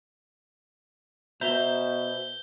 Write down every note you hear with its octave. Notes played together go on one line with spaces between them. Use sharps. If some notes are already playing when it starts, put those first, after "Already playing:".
B2 C5 E5 A#5 G6 G7